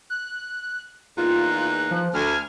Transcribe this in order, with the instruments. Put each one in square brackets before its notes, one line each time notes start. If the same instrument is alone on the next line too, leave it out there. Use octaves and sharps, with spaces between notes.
[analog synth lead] F#6
[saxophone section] E2 A#3 D#4 [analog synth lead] F4 [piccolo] F#6
[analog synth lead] F3
[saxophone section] D2 [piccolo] G#5 [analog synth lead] F6